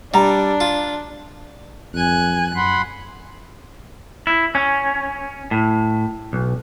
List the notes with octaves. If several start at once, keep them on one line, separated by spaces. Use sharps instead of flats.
G3 D4 A#5
F4
F2 G#5 F#6
F#2 F#5 B5 C6
E4
C#4
A2
B1